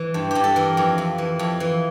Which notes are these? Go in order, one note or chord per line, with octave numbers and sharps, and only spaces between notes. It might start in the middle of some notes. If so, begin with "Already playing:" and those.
Already playing: E3
G2
G2 G4
A4
E3 A#4
F2
F2
E3
F2
E3